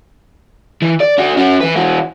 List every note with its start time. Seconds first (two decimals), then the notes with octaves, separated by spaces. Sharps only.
0.82 E3
1.01 D5
1.18 D4 F#4
1.37 C#4 F#4
1.60 E3 B4
1.76 E3 F#4